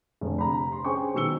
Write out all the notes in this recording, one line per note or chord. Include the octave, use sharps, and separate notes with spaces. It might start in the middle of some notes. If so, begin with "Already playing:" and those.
F1 D3
C3 A#5 B5
C6
C#4 G#4 C5 G5 G#5 C#6
B2 D#3 F#3 E6 C#7 G7